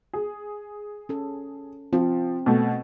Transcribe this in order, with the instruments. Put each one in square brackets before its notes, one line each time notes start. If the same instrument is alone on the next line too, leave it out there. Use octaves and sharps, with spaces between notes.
[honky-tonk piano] G#4
[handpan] C#4 A4
[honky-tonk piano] F3 [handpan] C4
[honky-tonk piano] B2 A3